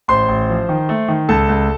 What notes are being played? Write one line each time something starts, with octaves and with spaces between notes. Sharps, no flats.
A1 C5 C6
A1
F3
D#3
A3
D#3
C#2 A4 A5
C#2